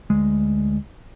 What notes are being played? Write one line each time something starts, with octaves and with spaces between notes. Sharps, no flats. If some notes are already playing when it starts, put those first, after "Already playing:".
D2 G#3